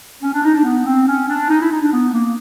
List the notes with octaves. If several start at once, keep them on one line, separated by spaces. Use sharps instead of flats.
C#4
D4
D#4
D4
B3
C4
C#4
D4
D#4
E4
D#4
D4
B3
A#3